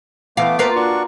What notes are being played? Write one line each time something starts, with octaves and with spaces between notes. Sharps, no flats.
E3 A3 B3 F5 D6
A#3 F4 B4
D4 F#4 C#6